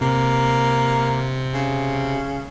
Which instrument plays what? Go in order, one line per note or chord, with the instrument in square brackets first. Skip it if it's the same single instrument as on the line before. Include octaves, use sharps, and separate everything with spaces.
[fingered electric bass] C3 [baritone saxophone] A#3
[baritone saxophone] C#3